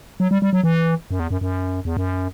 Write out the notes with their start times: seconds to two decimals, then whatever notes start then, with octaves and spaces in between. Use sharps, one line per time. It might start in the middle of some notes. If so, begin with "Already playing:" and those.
0.20 F#3
0.31 G3
0.42 G3
0.53 F#3
0.64 E3
1.11 F#2
1.20 E2
1.31 F#2
1.41 F#2
1.85 E2
1.97 F#2